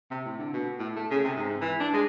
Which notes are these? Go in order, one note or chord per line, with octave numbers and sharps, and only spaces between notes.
C3
A2
D3
B2
A2
A3
C#3
C3
G#2
E3
D4
G#3